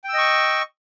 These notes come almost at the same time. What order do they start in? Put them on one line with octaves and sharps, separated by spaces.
G5 E6 D#5 C#6